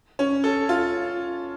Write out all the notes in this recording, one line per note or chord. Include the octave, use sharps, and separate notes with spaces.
C#4
A4
F4